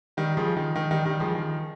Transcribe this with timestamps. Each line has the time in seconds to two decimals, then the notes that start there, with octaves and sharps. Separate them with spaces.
0.17 D#3 G3
0.37 C#3 F3
0.57 D#3
0.76 D#3
0.91 D#3 G3
1.05 D#3 G3
1.20 C#3 F3
1.35 D#3